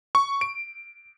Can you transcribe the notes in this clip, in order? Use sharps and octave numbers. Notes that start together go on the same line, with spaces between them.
C#6
D7